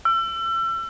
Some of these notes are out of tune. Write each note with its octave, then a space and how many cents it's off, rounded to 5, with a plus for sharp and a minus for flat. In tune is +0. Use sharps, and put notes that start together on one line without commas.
E6 +35